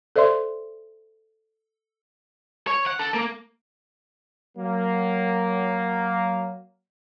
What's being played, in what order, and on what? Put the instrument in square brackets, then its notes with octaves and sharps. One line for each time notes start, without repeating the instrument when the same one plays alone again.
[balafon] A4 C5 D5 E5 C6
[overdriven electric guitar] C#5
F#5
A4
A#3
[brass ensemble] F#3 A#3